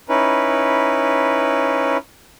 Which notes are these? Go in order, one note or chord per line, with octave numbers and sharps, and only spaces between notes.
C#4 D#4 E4 B4